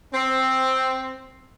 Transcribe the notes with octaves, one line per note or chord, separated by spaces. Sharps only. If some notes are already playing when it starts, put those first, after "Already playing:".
C4